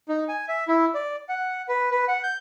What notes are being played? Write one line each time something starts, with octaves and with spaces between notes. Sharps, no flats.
D#4
G#5
E5
E4
D5
F#5
B4
B4
F#5
G6